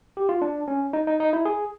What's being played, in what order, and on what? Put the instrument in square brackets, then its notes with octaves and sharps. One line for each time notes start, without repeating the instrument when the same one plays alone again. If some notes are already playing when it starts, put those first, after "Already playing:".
[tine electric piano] G4
F4
D4
C#4
D#4
D#4
D#4
E4
G#4